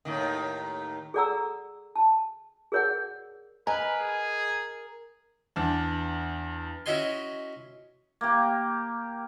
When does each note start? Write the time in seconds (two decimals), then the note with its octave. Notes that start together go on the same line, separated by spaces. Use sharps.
0.05 D#2 A2 D#3
1.14 G#4 A4 D5 F#5 A#5 E6
1.96 A5
2.72 G#4 A#4 C#5 D5 F#5
3.67 A#4 B4 D#5 G#5 A#5
4.00 G#4
5.56 E2 D4
6.86 C#4 E4 F#4 D#5 G#5 C6
8.21 A#3 G4